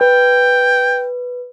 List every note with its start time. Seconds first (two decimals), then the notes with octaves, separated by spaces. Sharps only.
0.01 B4 G5